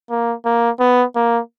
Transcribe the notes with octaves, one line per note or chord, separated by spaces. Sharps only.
A#3
A#3
B3
A#3